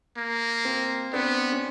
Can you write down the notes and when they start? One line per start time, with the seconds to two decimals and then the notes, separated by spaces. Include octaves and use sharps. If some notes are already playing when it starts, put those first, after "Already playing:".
0.17 A#3
0.65 C4
1.13 B3 C4 D4
1.52 C#4